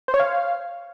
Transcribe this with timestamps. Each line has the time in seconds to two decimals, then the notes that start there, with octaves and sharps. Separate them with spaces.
0.08 C5
0.14 C#5
0.20 F5